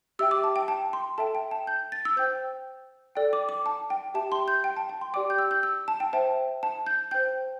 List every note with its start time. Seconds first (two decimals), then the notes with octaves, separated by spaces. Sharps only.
0.19 G4 E5 G5 E6
0.31 D6
0.44 A5
0.56 G5
0.68 A5
0.93 C6
1.18 A4 E5 G5 A5
1.35 G5
1.51 A5
1.67 G6
1.92 A6
2.05 E6
2.16 C5 G5 G6
3.15 A4 D5 G5
3.33 D6
3.49 D6
3.66 A5
3.90 G5
4.14 G4 E5 G5 A5
4.32 C6
4.48 G6
4.64 G5
4.77 A5
4.89 G5
5.01 C6
5.14 G4 D5 G5 D6
5.30 G6
5.38 E6
5.51 G6
5.63 E6
5.88 A5
6.00 G5
6.13 C5 E5 G5 A5
6.63 A5
6.86 G6
7.11 C5 G5 G6